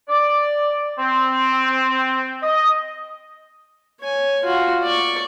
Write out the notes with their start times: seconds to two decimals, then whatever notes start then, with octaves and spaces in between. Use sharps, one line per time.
0.09 D5
0.99 C4
2.43 D#5
4.01 C#5 G#5
4.44 F4 F#4
4.83 D5 C#6